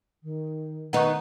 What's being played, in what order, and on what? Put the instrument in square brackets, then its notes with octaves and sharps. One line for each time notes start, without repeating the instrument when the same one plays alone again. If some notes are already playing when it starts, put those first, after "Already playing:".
[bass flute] D#3
[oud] D#3 B3 D#4 [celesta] F#5 C#6